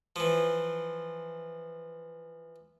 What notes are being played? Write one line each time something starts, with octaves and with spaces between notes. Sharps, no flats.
E3 F3